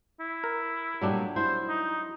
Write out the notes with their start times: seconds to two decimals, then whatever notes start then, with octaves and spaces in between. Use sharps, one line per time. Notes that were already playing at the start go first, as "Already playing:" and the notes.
0.20 E4
0.44 A#4
1.02 A#2 F#3 G3 A3 D4 G4
1.36 E4 C5
1.69 D#4